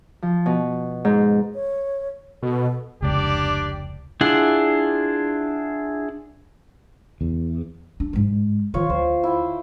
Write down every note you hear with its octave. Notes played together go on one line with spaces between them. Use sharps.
F3
B2
G#2
C#5
B2 A4
F1 C#2 D4 G4 D5
D4 E4 F4 G#4 F#5
E2
D4
G#2 G#3
D#3 E3 F4 C#5
D2 C5
E4 G5